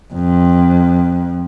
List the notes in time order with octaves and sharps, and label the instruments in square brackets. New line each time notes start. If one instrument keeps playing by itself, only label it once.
[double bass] F2